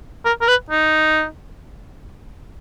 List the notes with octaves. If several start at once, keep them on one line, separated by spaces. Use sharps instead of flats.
A#4
A#4
B4
D#4